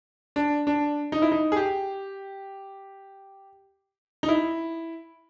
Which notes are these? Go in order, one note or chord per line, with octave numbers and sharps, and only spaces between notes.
D4
D4
D#4
E4
D#4
G#4
G4
D#4
E4